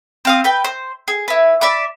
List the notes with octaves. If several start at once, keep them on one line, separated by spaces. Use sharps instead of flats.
C4 F5 D#6
B4 G5
C5
G#4
E4 B4
D5 E5 B5 D6